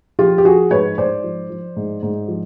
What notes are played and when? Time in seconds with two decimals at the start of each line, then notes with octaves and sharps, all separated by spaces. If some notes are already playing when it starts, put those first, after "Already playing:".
0.19 F3 F4 G4
0.38 G4
0.45 F3 F#4 G#4
0.71 G#2 B4 C#5
0.98 G#2 C5 D5
1.24 F3
1.50 F3
1.76 G#2
2.03 G#2
2.28 F3